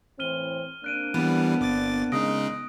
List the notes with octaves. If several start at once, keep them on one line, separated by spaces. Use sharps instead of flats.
A2 E3 C4 F6 D#7 G7
A#3 C4 D4 F#6 D7 D#7
E3 G3 B3
G1 D6 A6
C#3 G#3 D#4 D#6 A#6 D7